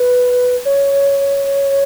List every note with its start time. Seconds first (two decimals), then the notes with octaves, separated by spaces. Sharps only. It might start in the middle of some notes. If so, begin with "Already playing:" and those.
Already playing: B4
0.65 C#5